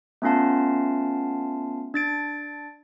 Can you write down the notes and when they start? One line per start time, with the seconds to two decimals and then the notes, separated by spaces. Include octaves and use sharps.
0.22 A3 B3 C#4 F4 F5 A5
1.94 D4 A6 D7